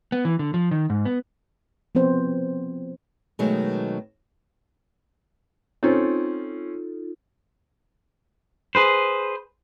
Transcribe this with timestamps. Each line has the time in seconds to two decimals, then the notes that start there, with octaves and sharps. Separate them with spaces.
0.12 B3
0.25 E3
0.39 D3
0.54 F3
0.71 D#3
0.90 G#2
1.05 B3
1.95 F3 B3 C4 C5
3.39 B2 D#3 F#3 G#3 A3
5.83 C4 C#4 D#4 F4 A4
8.75 G#4 B4 C5